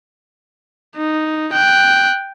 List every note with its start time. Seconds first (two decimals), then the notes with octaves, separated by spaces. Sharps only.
0.97 D#4
1.53 G5 F#6